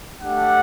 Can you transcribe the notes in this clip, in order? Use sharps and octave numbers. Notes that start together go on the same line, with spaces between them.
A3 D4 G4 F#5